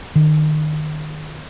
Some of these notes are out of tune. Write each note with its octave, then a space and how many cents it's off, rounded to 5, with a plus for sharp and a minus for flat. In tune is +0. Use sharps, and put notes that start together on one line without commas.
D#3 -25